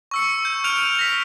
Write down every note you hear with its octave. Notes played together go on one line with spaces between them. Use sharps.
C#6 E6 C#7
G6
F6 G6 D7 F7
A#6 B6